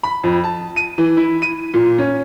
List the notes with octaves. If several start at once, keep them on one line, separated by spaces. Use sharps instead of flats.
B5
F2
A5
D#7
E3
E4
D#7
A#2
C#4